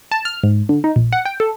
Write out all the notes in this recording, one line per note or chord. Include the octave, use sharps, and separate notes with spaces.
A5
F6
G#2
D3
D#4
A#1
F#5
G5
A4